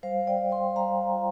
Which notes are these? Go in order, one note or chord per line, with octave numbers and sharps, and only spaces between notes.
G3 C5 F5
D5 G5
G3
G5 C6
G3 F5 A#5
F4